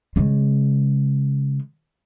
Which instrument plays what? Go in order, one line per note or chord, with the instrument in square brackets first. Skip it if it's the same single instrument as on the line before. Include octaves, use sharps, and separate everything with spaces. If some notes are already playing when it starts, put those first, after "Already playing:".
[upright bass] C#3 G#3